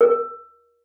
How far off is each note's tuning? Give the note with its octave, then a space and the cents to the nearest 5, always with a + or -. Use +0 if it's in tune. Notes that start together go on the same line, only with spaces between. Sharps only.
A#4 +30